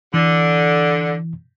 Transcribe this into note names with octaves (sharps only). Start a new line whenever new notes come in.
D3 E3